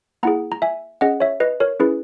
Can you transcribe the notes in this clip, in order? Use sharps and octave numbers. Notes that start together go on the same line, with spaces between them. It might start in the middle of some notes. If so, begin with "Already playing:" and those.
A#3 E4 G#4 F#5 A#5
A#5
E5 G#5
C#4 G#4 D#5 F#5
C#5 E5
B4 D#5
A#4 C#5
C#4 E4 G#4 B4